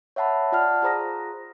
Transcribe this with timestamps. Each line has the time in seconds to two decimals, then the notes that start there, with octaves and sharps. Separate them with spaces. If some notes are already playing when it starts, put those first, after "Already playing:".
0.16 C#5 E5 F#5 A5 B5
0.52 F4 D5 F#5 A5 F6
0.82 F4 G#4 C5 A#5 D#6 A#6